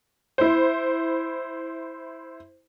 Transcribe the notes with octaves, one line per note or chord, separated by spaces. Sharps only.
E4 C5